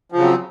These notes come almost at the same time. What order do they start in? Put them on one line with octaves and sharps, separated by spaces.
F3 C#3 F#3 C4